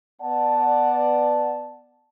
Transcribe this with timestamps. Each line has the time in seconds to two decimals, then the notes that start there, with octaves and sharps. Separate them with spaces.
0.22 B3 D5 F#5 A5